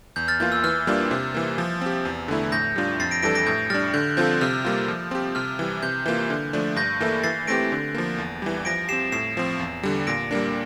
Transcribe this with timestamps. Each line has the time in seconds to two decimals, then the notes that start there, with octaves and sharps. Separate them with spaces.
0.16 E2 G6
0.28 F6 A6
0.40 E3 A#3 F4 G6
0.52 E6
0.64 E3 F6
0.87 G3 A#3 D4 F4
1.11 C3
1.34 E3 A#3
1.58 F3
1.81 C4 G4
2.05 E2
2.28 D3 A3 E4
2.52 A2 G6 A#6
2.76 G3 D4 F4
2.99 F2 A6 C7
3.11 A#6 D7
3.23 E3 G3 D4 A4 A#6 D7
3.35 A#6 D7
3.46 A2 G6
3.70 G3 D4 F6 A6
3.94 D3 G6
4.17 F3 C4 F4 A4 G6
4.41 C3 F6
4.65 G3 A#3 F4
4.88 F3
5.11 C4 G4
5.35 C3 F6
5.59 E3 G3
5.83 C3 G6
6.06 E3 A#3 F4
6.30 D3
6.53 F3 A3 D4
6.76 G2 G6 A#6
7.00 E3 A#3 E4 A4
7.23 E3 A6 C7
7.47 A3 C4 G4 A#6 D7
7.72 D3
7.94 F3 A#3
8.18 E2
8.42 E3 G3
8.65 F3 A#6 D7
8.89 C4 G4 C7 E7
9.12 A2 C7 E7
9.37 F3 C4
9.59 E2
9.83 D3 G3
10.07 A#2 A#6 D7
10.31 G3 A#3 D4